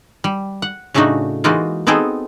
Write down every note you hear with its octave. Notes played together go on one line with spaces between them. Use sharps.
G3
F#5
A2 C#3 A3 D4 D#4 F#4
E3 G#3 A#3 D#4 F4 F#4
B3 C4 D#4 G#4 A4